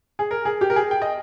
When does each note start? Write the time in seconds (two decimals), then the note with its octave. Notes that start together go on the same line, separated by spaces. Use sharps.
0.19 G#4
0.31 A#4
0.45 G#4
0.61 G4
0.70 A#4
0.76 G#4
0.91 G5
1.02 D#5